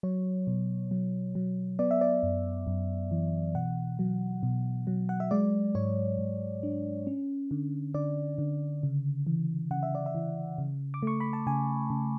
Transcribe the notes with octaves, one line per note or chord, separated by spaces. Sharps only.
F#3 C#5
B2
F#3
F#3
B3 D5
E5
D5
F#2
F#2
E3
B2 F#5
F#3
B2
F#3
F#5
E5
G#3 D5
G#2 C#5
G#2
D4
C#4
D3
D3 D5
D3
C#3
E3
C#3 F#5
E5
D5
E5
E3
C#3
D6
A3 C#6
B5
A5
C#3 G#5
C#3